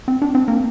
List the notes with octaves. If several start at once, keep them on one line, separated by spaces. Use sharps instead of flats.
C4
D4
C4
A#3